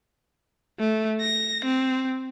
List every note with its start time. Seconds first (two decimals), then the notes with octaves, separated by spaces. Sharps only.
0.79 A3
1.21 A#6
1.65 C4